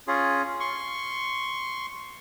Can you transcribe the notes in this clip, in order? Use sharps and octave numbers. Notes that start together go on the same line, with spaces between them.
C#4 F4 G#4
C6 C#6